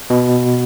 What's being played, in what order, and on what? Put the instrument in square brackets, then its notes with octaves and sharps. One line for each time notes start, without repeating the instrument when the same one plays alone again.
[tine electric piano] B2